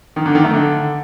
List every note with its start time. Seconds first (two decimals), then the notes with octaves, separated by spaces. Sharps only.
0.16 D#3
0.26 D3
0.35 D#3
0.44 A3
0.53 D3